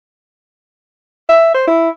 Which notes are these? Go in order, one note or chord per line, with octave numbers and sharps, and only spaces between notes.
E5
C5
E4